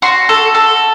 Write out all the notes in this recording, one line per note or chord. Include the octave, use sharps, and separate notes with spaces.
F#4 C6
A4
A4